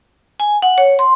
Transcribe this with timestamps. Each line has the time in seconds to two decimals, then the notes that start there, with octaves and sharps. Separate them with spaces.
0.40 G#5
0.62 F#5
0.78 C#5
0.99 C6